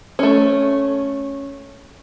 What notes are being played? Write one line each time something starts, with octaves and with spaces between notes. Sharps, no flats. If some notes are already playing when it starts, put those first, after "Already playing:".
A3 C#4